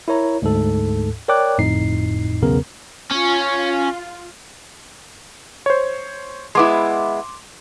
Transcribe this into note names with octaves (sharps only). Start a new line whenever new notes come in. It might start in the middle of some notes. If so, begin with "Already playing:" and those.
E4 A#4 C#5 A#5
D2 G#2 A4
A#4 C#5 D5 G5 D6 F#6
G1 F2 A2 D#4 C7
B1 E2 C#3 B3 A#4
C#4 F4
C5 C#5
G#3 B3 E4 C6 D6